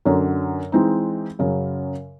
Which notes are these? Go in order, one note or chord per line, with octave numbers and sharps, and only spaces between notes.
F#2 D3 F#3
E3 G#3 C4 D#4
F#2 C#3 F#3